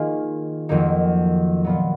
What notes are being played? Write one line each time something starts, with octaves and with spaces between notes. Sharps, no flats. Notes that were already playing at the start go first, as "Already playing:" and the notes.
Already playing: D#3 A#3 F4 G#4
F2 D#3 F#3 A#3 D#4
A#2 F#3 B3 F4